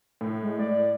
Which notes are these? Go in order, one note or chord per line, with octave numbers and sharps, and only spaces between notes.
A2
G#3
D5